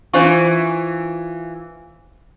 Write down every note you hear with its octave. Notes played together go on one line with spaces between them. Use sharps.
E3 D4 F4 C5 C#6